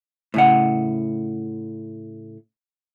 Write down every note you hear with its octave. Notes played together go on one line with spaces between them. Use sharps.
A2 C#3 F#5